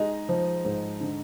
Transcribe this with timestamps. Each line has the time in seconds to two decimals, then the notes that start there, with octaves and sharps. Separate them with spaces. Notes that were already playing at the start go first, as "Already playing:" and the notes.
Already playing: G#3 D#4
0.29 F3
0.65 G#2
1.01 D3